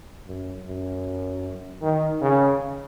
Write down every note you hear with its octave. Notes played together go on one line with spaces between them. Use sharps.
F#2
F#2
D#3
C#3